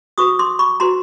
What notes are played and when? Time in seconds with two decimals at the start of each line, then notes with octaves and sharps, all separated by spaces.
0.18 F#4 B4 C#6 D#6
0.39 C6 D6
0.59 B5 C#6
0.80 F#4 B4 A#5 C6